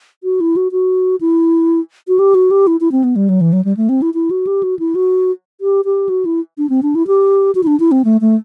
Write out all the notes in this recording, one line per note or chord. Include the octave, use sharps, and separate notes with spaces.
F#4
E4
F#4
F#4
E4
F#4
G4
F#4
G4
E4
E4
C4
B3
G3
F#3
E3
F#3
G3
A3
C4
E4
E4
F#4
G4
F#4
E4
F#4
G4
G4
F#4
E4
D4
C4
D4
E4
G4
F#4
E4
D4
E4
C4
A3
A3